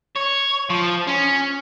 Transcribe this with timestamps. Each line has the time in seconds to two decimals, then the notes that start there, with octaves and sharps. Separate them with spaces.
0.16 C#5
0.70 F3
1.07 C#4